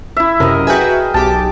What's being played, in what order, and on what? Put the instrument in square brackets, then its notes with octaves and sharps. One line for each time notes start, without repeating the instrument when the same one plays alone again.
[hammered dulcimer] E4 E5
[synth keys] F#2 C3 [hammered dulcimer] A#4 D#5
[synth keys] F#4 B4 E5 [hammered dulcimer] G#4 G5
[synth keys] B1 G4 D6 [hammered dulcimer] A5